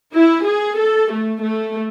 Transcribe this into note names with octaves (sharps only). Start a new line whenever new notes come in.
E4
G#4
A4
A3
A3